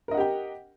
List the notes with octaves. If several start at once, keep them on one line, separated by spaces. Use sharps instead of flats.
G4 A#4 D#5 F#5 G5